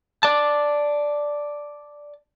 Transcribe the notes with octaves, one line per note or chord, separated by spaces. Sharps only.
D5 A5